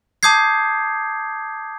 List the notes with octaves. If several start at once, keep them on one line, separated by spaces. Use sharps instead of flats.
A5 D6 D#6 G6 G#6 C7